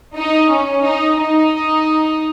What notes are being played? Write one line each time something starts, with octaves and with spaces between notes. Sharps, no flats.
D#4
C#4
D#4
D#4